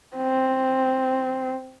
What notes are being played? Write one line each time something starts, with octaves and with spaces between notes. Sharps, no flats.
C4